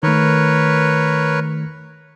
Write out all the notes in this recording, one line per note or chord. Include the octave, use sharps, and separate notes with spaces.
D#3 A3 A#4 B4 C#5